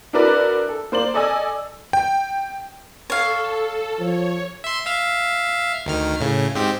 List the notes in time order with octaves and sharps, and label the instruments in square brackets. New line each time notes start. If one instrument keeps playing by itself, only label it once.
[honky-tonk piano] D4 E4 F#4 A#4 B4 D5
A4
A#3 C5 D5 F#7
A4 D5 D#5 G#5 E6
[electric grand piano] G5
[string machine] A4 [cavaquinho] C#5 F5
[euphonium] F3 [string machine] C#5
[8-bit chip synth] E5 C6
E5 F5
D2 D#3 F6
A2 C#3
G#2 C4 G4